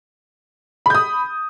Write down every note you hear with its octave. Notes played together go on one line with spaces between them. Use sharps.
B5 D#6 G6